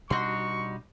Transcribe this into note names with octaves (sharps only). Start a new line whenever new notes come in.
B2 G3 D4 D#4 F#4 C6 C#6